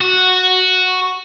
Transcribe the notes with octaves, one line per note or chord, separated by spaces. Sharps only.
F#4